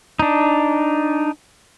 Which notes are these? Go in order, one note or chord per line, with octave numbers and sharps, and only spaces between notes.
D4 D#4